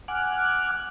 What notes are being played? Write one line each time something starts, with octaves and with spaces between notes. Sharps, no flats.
F#5 G#5 D6 F6 F#6